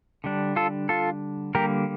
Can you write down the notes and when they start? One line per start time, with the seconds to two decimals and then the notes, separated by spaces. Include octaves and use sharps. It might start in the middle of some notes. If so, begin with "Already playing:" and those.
0.24 D3 G3 D4
0.56 F4 A4
0.89 F4 A4
1.55 D3 G3 A#3 G4 A#4